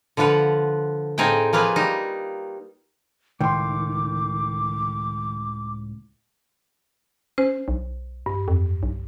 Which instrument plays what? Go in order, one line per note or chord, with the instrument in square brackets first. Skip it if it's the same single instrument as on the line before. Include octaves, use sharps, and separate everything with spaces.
[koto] D3 F3 F4 B4 F#5
A2 C4 D#4 G#4 F5 G5
F3 A#3 F4 G#4 B4
G3 D#4
[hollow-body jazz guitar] C#2 A2 [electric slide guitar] D#3 [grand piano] G5 C6 [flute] D6
[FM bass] C#4 [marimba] C5
[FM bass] B1
[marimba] G2
[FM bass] F2
B1